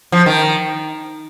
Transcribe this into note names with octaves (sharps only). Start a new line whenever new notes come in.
F3
D#3